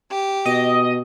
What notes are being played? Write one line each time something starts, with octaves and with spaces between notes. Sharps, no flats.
G4
B2 D#5